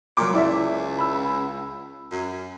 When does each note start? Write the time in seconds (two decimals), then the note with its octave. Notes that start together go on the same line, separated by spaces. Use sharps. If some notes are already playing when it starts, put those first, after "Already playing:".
0.17 A#2 F#3 A#4 D6
0.33 C#2 E4 D5 E5
0.98 B5 E6
2.11 F#2